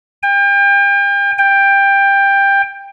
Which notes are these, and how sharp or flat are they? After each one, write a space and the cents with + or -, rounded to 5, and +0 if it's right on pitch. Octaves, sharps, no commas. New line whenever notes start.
G5 +35
G5 +15